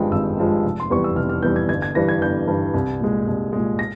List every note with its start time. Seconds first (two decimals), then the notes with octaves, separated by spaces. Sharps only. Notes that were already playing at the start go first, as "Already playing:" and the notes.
Already playing: G#1 G2 F3 G#3 G5
0.12 G#1 E6
0.37 G2 F3 G#3
0.64 F1
0.80 C6
0.90 E2 E3 G3 C#6
1.04 E6
1.16 F1 F6
1.29 F6
1.42 E2 E3 G3 G6
1.56 G#6
1.69 G1 G#6
1.82 G#6
1.95 G2 E3 G3 A#6
2.09 G#6
2.21 G1 G6
2.48 G2 E3 G3
2.74 C2
3.00 A#2 G#3
3.27 C2
3.53 A#2 G#3
3.79 A#6